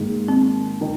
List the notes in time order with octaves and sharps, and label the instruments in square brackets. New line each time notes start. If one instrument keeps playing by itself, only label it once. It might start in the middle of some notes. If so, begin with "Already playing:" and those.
Already playing: [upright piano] G#2 D#3 A#3 [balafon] G#3
[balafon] C4
[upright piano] D#3